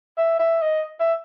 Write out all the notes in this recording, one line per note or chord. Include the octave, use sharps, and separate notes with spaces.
E5
E5
D#5
E5